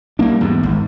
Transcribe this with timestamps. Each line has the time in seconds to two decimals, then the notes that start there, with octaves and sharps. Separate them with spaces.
0.19 G3 A#3 D4
0.41 E2 G#2
0.63 G#1